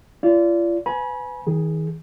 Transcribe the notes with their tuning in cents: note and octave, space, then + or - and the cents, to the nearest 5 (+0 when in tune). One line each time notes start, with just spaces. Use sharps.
F4 -40 D5 -25
B4 +30 G#5 +20 B5 -35
D#3 +40 G#4 +0